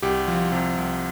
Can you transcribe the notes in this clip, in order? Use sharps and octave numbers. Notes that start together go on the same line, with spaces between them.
C2 G4
F3
C3
C2